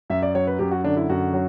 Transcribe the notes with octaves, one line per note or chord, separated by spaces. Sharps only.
F#2 E5
D5
F#3 C#5
B4
F#2 G4
F#4
D3 D4
E4
F#2 F#4
F#3